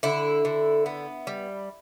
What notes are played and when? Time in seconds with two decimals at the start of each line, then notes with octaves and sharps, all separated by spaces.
0.03 D3 E4
0.45 D3
0.86 B3
1.27 G3